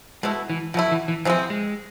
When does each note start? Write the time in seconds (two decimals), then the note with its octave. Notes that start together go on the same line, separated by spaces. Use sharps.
0.23 B2 G#3 A3 E4
0.50 E3
0.74 B2 F3 A3 E4
0.92 E3
1.08 E3
1.25 C3 E3 F3 G#3 C4
1.50 G#3